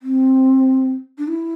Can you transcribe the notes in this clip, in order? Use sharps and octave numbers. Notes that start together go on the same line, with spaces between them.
C4
D4
E4